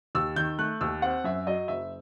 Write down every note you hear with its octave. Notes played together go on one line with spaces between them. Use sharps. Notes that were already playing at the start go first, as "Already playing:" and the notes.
D#2 E6
D#3 G6
A3 F#6
D#2 E6
C4 F#5
F#2 E5
F#3 D#5
F#1 E5